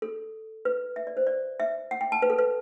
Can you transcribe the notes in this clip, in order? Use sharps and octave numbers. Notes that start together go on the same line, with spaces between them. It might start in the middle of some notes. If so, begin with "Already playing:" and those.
A4
B4
E5
D5
C5
D5
E5
F#5
G5
A5
B4
A4
B4